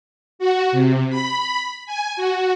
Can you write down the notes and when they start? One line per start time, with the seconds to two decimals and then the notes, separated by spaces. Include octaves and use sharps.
0.39 F#4
0.72 C3
1.10 B5
1.86 G#5
2.16 F#4